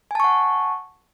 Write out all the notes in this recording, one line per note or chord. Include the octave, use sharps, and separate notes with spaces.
F#5 G#5 A5 C#6